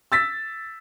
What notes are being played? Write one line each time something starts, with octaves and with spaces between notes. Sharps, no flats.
E6 A6 B6